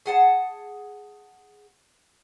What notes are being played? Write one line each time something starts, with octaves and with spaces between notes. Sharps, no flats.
G#4 F#5 A5